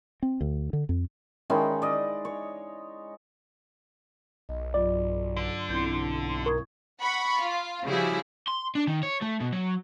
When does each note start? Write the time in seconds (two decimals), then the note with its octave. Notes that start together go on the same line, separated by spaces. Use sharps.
0.22 C4
0.41 D2
0.73 D3
0.89 F2
1.50 D#3 G#3 C#4 E4
1.82 D5 D#5
2.25 C#5
4.49 B1 D#5
4.74 G2 F#3 F4 D5
5.37 D3
5.69 B1 C4 E4 G6
6.46 A#4 C#6 D#6 G#6
7.01 F#5 B5 C#6
7.39 F4
7.85 C#3 F3 G3 E4 F#4 G#4
8.48 C6
8.75 D4
8.88 D#3
9.03 C#5
9.22 A3
9.41 B2
9.53 F#3